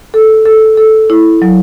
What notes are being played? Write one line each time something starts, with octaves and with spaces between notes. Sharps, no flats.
A4
A4
A4
E4
F#3